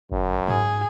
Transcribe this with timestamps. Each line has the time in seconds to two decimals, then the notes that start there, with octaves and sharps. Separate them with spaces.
0.12 G1 F#2
0.48 G#2 G#4